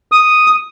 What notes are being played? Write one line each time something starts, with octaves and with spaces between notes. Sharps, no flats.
D#6